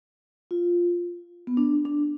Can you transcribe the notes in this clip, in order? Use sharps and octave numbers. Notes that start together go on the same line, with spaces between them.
F4
B3
D4
D4